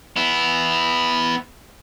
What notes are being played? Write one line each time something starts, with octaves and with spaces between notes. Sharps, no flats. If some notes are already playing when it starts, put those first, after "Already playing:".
B3 E4